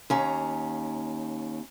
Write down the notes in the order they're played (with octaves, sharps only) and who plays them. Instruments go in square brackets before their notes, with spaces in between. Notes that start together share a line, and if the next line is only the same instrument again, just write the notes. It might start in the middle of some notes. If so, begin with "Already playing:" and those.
[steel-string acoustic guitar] D#2 C#4 A#5